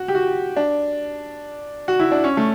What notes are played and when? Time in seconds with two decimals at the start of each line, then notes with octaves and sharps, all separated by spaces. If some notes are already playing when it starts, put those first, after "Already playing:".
Already playing: F#4
0.08 G4
0.15 F#4
0.56 D4
1.88 F#4
2.00 E4
2.12 D4
2.24 C#4
2.37 A3